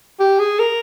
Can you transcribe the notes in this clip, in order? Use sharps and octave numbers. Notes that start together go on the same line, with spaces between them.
G4
G#4
A#4